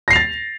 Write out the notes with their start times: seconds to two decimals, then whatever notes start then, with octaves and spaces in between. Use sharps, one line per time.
0.08 A#6
0.10 C7
0.13 F7
0.16 A6